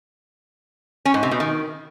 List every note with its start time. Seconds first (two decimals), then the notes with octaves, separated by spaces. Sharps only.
1.05 C#4
1.14 G#2
1.23 C3
1.31 B2
1.40 D#3